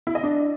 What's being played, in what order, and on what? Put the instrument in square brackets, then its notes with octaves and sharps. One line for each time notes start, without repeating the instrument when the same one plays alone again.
[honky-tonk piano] E4
D#5
D4